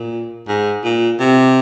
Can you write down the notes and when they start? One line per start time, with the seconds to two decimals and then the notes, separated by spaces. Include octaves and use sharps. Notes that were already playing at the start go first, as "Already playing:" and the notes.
Already playing: A#2
0.48 G#2
0.84 A#2
1.20 C3